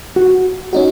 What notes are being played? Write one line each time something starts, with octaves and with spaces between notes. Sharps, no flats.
F#4
C#4 D#4 F#4